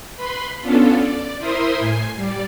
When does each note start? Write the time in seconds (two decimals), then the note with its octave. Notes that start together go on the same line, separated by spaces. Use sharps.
0.17 B4 B5 C6
0.62 B3 C#4 D4 F4 A4
0.98 D5
1.39 E4 A#4 C5 E5 C6 D#6
1.79 A2 G#5 C7
2.15 G3 D5